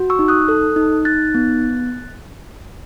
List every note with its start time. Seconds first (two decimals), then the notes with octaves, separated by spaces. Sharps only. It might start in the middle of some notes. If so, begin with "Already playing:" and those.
Already playing: F#4
0.10 C#6 E6
0.19 D#4
0.28 D#6 F#6
0.48 A4
0.76 D#4
1.05 D#4 F#6 A6
1.35 B3